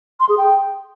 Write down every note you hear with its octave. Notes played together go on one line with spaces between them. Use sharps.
C6
G#4
G5